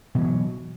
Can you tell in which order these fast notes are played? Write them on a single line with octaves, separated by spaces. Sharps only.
B2 E3 G#3 F#3